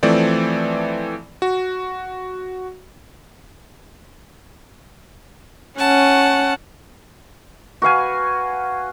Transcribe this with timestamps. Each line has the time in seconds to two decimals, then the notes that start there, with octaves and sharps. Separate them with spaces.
0.03 E3 F3 A3 C4 D5
1.42 F#4
5.79 C#4 F#5 A5
7.82 F#4 B4 F5 G#5